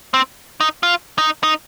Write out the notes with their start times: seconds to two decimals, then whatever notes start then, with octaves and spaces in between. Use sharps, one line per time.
0.14 C4
0.61 D#4
0.83 F4
1.18 D#4
1.43 D#4